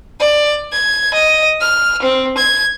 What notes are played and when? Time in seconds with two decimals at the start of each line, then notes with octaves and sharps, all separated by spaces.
0.20 D5
0.72 G#6
1.14 D#5
1.61 F6
2.02 C4
2.37 G#6